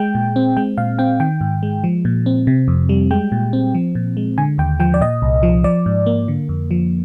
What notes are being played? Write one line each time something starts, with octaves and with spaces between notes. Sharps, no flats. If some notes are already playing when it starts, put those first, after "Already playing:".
Already playing: G#3 G5
A#2
C4
G#3 G5
A#2 F5
C4 G5
D#3 G5
G#2
G#3
F3
A#2
C4
C3
F2
G3
G#3 G5
A#2
C4
F3
A#2
G#3
D3 G#5
D#2 G5
F3 G5
D5
A#2 D#5
C2
F3
F3 D5
G#2
A#3
D3
F2
F3